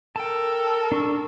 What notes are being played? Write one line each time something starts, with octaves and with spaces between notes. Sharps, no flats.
A4 A#4 G5 A5
D4 A5 C#6